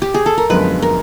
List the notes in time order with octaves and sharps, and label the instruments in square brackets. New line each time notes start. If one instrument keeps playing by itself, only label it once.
[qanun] G4
G#4
A4
A#4
[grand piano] F#2 D3 F3 G#3 B3 [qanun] B4
[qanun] A#4